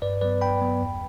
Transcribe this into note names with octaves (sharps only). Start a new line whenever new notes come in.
G2 B4 D5
F#3 B3 B4 D5
G2 G5 B5
F#3 B3
E2